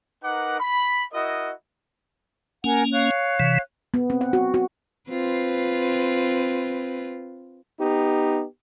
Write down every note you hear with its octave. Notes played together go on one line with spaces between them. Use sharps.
D#4 A#4 B4 F#5 D6
B5
E4 F#4 A#4 D#5
A#3 C#4 A#4 F#5 G#5
C#5 F5 F#6
C3 E3
B3
C4
F#5
F#4
F#4
C4 F4 B4
B3 D#4 G4